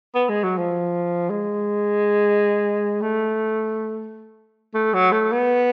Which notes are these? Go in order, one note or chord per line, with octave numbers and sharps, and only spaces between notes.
B3
G#3
F#3
F3
G#3
A3
A3
F#3
A3
B3